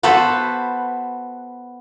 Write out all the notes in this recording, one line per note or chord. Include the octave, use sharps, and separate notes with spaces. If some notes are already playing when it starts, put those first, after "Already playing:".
B3 F#4 A4 B4 C5